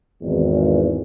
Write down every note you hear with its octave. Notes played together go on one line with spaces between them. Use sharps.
G#1 E2